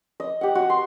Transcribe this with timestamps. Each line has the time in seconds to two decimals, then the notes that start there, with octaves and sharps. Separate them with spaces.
0.20 D#5
0.41 G4 F#5
0.55 F#4
0.70 C6